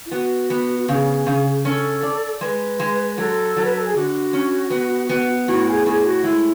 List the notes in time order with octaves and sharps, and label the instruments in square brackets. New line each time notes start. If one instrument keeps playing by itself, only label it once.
[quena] E4
[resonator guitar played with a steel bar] B3 [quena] F#4
[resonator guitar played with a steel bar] B3
[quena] F#4
[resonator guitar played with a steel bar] C#3 [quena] G#4
[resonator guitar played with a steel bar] C#3
[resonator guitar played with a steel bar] C#4 [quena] A4
[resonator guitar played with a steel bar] D5
[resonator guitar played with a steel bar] G#3 [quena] B4
[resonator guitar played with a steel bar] G#3
[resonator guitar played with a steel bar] F#3 [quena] A4
[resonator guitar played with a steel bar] F#3
[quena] B4
A4
G#4
[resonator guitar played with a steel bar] D3 [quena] F#4
[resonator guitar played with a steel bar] C#4
B3
B3
[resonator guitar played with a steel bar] A2 [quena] F#4
[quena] G#4
[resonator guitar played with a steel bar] A2 [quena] G#4
[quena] F#4
[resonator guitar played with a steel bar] G#3 [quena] E4